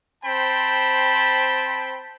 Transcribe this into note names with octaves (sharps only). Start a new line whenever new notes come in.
C4 C5 G5 A5 B5